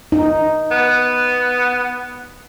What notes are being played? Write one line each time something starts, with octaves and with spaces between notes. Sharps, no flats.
D#4
B3